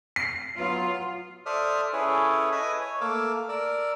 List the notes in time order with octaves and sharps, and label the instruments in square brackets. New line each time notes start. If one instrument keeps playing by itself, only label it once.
[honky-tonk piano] C7
[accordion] F#3 B3 [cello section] F4
[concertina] A4 C5 D5 E5 D#6 F6
C#4 E4 G#4 A4 B4 C#5
B4 D#5 E5 G#5 D#6
C#5
A3 A#3 F5 D6 E6
A#4 D5 E6